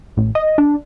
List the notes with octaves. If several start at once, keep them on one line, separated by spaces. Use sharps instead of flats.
A1
D#5
D4